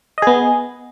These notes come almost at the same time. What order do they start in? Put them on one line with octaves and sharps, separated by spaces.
D#5 G#4 B3